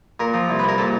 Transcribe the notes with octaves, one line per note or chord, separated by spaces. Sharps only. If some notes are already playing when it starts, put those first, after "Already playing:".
A#2 A#4
F3
C2
B4
C2 A#4
A#2 A4